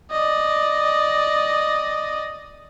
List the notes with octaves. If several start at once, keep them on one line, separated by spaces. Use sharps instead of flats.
D5 D#5